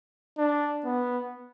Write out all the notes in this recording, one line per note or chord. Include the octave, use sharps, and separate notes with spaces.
D4
B3